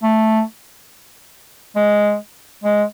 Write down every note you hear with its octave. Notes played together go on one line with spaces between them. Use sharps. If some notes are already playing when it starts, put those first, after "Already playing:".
A3
G#3
G#3